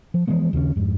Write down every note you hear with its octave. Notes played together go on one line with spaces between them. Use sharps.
F3
E3 F3 G#3 B3
D#2 C#3 G3 C#4
F2 G#2